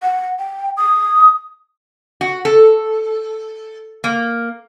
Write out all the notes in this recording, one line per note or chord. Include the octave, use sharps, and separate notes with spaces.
F#5
G5
D#6
F#4
A4
A#3